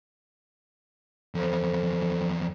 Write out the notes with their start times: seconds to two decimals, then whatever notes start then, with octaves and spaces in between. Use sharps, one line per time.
1.35 E2 F3 A4 C5